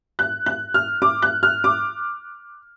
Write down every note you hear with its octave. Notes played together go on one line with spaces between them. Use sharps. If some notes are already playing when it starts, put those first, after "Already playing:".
F#6
F#6
F6
D6
F#6
F6
D6